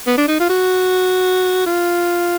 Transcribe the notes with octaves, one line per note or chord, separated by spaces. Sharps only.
B3
D4
D#4
F4
F#4
F4